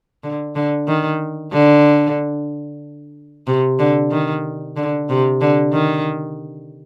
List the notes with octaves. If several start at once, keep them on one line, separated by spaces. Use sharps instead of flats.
D3
D3
D#3
D3
C3
D3
D#3
D3
C3
D3
D#3